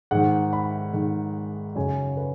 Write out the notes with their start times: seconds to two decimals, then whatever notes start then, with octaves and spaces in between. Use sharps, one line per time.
0.11 G#2 D#3 F#5
0.53 B5
0.93 G#2 D#3
1.75 F#2 C#3 G#5
2.17 B4